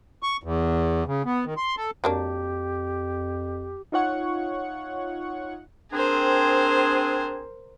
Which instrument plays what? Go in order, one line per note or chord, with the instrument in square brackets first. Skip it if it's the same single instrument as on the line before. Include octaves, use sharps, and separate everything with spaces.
[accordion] C#6
E2
C#3
B3
D#3
C6
A4
[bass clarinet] F2 [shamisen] F#3 A#3 D4 [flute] G4
[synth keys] D#4 F4 C#5 F#5 C#6
[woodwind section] C4 D4 G#4 [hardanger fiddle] A#4 C5